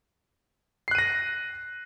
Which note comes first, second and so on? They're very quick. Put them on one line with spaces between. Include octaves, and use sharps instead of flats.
C7 F#6 D#7 A#6